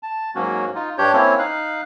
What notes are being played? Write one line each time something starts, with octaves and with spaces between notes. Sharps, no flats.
A5
G#2 F#3 A#3 C#4 F#4
D#4 F4
G2 D4 G4 C#5 G6
A#3 C4 C#4 E4 C#5
D#4 F5 F#6